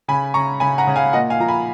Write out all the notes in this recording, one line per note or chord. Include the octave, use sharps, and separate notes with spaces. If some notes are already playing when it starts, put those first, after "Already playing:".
C#3 G#5 B5
C#3 A#5 C#6
C#3 G#5 B5
F#5 A#5
C#3
F5 G#5
A#2 D#5 F#5
F5 G#5
F3 A#5
G#5 B5